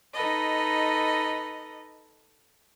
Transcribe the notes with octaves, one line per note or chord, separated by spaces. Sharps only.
D#4 A4 B4 D#5